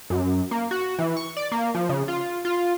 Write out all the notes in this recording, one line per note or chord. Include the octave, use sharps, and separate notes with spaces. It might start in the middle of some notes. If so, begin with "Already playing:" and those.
F#2
A#3
F#4
E3
C#6
D5
A#3
F3
C#3
F4
F4